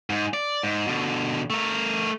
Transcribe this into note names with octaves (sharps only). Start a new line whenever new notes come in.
G#2
D5
G#2
B2 D3
A3 A#4